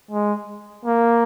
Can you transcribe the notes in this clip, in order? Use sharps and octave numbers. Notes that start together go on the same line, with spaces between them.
G#3
A#3